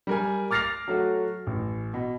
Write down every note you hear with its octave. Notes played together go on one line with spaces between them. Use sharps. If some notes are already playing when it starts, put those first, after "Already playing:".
G3 A#4 G#5
D6 F6 A6 A#6 C7 F7
F#3 A3 F#4
A1
B2